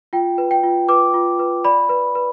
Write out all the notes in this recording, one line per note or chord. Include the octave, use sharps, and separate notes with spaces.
F4 G5
B4
G5
F4
B4 D6
F4
B4
D5 B5
B4
B4